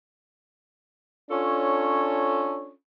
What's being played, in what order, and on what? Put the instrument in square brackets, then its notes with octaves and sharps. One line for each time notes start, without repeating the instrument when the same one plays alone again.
[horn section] C#4 D4 F4 A4 C#5